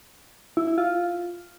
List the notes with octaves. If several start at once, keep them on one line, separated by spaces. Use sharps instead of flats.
E4
E4
F4